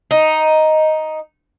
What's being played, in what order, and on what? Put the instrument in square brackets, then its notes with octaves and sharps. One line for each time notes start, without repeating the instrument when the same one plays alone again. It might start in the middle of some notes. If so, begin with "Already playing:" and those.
[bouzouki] D#4